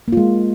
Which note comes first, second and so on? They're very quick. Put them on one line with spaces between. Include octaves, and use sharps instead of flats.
A#3 F4 G#3